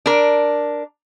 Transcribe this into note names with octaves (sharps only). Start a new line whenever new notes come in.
D4 A#4